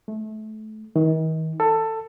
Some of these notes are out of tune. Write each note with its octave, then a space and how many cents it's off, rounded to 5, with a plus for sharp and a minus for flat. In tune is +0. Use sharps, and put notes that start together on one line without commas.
A3 -25
D#3 +40
A4 +15